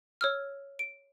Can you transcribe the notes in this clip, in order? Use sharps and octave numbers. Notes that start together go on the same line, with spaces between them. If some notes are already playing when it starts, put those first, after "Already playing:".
C#5 E6 F6
D7